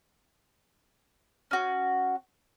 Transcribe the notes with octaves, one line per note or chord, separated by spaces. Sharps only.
C#4 F#4